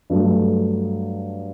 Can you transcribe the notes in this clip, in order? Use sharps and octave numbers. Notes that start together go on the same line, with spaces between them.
G2 F#3 A3